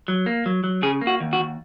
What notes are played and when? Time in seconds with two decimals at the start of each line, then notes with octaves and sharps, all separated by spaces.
0.08 F#3
0.26 A#3
0.46 F#3
0.64 F#3
0.82 C#3 G#4
1.01 A#3
1.07 F#4
1.20 D#2
1.33 F#4
1.39 D#2